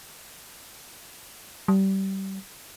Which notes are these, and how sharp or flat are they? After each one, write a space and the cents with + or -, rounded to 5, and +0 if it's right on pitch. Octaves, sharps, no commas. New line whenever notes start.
G3 -25